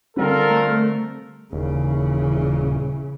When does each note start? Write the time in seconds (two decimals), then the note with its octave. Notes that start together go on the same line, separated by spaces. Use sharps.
0.16 D3 G3 C4 F4 A4 A#4
0.50 A3
1.53 D#1 C#3 E3